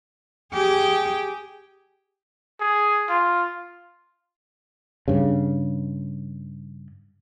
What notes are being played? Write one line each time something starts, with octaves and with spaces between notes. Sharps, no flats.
G4 G#4
G#4
F4
G2 C#3